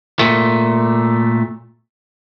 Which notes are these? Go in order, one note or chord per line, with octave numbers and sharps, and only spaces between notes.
A#2 A3